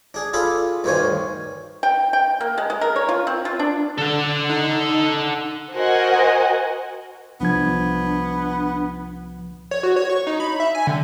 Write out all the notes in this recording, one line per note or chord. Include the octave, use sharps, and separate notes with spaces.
D4 G#4
F4 G#4 A4 D5 B5
D2 G2 D#3 C5 C#5 G#5
G5
G5
A#3
G#3
G#3
A#4
C#5
F4
C4
F4
D4
D3 A4 F#5
D#4
F#4 A#4 C5 D#5 F#5 G#5
C2 F3 B3 D4 G#6
C#5
F#4
C#5
C#6
D#4
B5
E5
G#5
D3